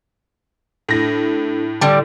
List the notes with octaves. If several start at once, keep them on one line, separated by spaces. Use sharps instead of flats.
A2 D4 E4 A4 A#6
D3 G3